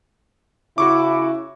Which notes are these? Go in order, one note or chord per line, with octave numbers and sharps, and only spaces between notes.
C#3 E4 F#4 C#6 D6